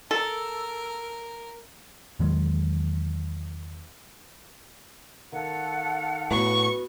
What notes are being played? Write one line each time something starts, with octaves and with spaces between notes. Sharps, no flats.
A4 A#4
E2 D#3 F#3 G#3
D#3 A4 F5 F#5
A2 B3 F#4 B4 C#6